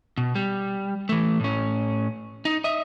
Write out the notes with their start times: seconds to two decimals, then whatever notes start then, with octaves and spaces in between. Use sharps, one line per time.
0.18 B2
0.35 G3
1.09 E3 A3
1.40 A2 C#4
2.45 D#4
2.64 D#5 E5